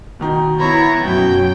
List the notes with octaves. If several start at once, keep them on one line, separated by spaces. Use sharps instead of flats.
B2 D#3 D#4
B3 E4 C#5 A#5 B5
F#2 B2 F#3 G5